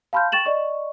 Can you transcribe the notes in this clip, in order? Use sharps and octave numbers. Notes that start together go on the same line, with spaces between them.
F5 A5 B5 C6 F6 G6
G5 C#6 A6 E7 F#7
D5 D#5 C#6